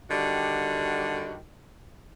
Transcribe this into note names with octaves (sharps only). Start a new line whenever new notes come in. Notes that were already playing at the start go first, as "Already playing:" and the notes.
D3 D#3 G3 F#4 G4